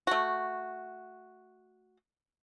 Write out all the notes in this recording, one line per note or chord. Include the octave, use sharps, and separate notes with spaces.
A3 F#4